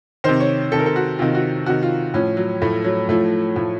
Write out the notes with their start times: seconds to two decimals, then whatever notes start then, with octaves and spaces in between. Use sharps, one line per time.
0.24 C3 D#3 C5
0.40 C#5
0.72 C3 D#3 A4
0.79 A#4
0.86 A4
0.96 F#4
1.19 C3 D#3 F4
1.34 F#4
1.66 C3 D#3 F#4
1.83 F4
2.14 A2 F3 C#4
2.37 F#3
2.62 A2 F3 A3
2.84 F#3
3.09 A2 F3 A3
3.56 A2 F3